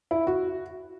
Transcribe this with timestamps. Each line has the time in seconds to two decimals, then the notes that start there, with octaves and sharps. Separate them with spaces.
0.11 E4
0.27 F#4